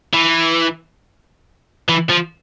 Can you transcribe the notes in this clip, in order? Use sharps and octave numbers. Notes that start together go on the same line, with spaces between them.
E3
E3
F3